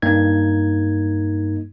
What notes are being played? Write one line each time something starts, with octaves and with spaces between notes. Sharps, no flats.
G2 A#3 D#4 G#6